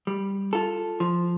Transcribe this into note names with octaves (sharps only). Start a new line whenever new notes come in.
G3
F4 A4
F3